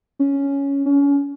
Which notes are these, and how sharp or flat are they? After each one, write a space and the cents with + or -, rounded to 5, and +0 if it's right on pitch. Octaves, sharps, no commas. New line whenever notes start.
C#4 +5
C#4 +30